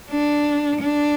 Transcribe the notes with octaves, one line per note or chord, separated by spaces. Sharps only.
D4
D4